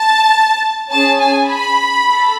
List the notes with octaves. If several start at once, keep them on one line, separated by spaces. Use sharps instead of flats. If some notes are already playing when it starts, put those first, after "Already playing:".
Already playing: A5
C#4 G#4 A5
G#5
B5
A4